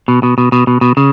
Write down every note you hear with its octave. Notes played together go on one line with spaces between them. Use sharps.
B2
B2
B2
B2
B2
B2
C#3